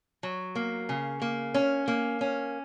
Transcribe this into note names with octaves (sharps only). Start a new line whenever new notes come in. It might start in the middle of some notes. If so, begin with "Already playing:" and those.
F#3
A#3
C#3
A#3
C#4
A#3
C#4